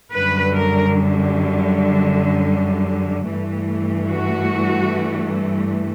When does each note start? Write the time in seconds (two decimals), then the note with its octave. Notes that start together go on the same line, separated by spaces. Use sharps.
0.13 F#2 D3 G3 B4
0.53 A#4
3.29 G2 E3 A3
4.08 F#4